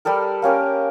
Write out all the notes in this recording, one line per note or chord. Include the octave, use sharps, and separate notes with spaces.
G3 G4 A4 A#4
A#3 C#4 G4 A#4